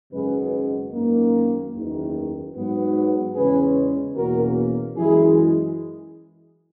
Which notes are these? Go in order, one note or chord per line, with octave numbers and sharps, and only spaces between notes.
G#1 F#2 C#3 G#3 B3 G#4 B4
G#1 F#2 D#3 A#3
F#1 E2 D#3
G#2 F#3 B3
E2 C#3 G#3 C#4 G#4 B4
E2 B2 A#3 C#4 F#4 A#4
F#2 E3 G#3 E4 G#4